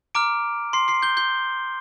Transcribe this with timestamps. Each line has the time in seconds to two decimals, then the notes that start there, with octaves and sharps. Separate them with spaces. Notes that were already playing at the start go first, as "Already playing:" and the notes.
0.15 A#5 D6 F6 D7
0.73 C6 C7
0.88 C6 C7
1.02 G6 G7
1.17 G6 G7